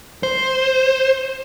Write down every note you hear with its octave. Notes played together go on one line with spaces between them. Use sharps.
C5